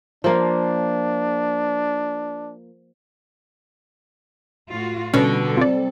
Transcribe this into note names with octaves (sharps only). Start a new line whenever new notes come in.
F3 A#3 D4 F4
A2 F4 F#4
B2 D3 G3 C#4 A4
C4 F4 D5